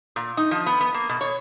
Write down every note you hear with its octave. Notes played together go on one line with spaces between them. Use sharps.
A#2
D#4
F3
B3
B3
A#3
B2
C#5